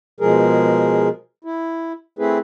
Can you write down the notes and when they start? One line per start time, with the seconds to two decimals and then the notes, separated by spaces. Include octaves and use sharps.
0.20 B2 F3 G#3 G#4 A#4
1.44 E4
2.19 A3 C4 E4 G#4 B4